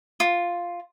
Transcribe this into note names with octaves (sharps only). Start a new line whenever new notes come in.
F4